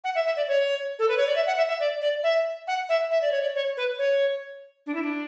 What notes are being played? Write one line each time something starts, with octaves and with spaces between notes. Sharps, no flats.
F#5
E5
E5
D5
C#5
A4
B4
C#5
D5
E5
F#5
E5
E5
D5
D5
E5
F#5
E5
E5
D5
C#5
D5
C#5
B4
C#5
D4
E4
D4